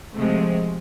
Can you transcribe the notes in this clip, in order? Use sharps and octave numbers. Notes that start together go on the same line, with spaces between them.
C3 F3 G#3 A3